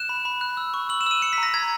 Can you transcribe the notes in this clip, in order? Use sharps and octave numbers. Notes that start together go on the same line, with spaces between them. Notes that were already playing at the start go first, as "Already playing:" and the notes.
Already playing: F#6 E7
B5
B5
F#6
E6
C#6
E6 F#7
E7
E6 D#7
E6 C#7
B6
A#5
A#6
A#5 G#6